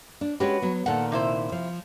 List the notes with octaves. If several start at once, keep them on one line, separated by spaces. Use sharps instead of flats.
D4
G#3 C#4 F#4 G4 B4
F#3 B3
A#2 D#3 A4 F#5
C3 E4 C5
F3